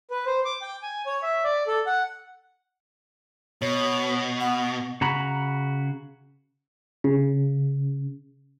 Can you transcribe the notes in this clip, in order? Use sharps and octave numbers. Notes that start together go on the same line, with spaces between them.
B4
C5
D6
G5
G#5
C#5
E5
D5
A4
F#5
B2 C#5
F#5
C#3 F#4 A#5 B5
C#3